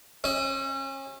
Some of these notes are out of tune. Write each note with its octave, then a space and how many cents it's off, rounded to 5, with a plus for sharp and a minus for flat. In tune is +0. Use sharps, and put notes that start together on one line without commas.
C#4 -35 D#5 +45